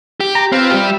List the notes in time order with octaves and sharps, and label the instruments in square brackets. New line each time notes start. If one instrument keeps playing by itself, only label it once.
[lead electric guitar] G4
[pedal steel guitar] A#5
[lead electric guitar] C4 [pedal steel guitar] F4 B4 F5
[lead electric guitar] G3 G4
[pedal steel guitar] E5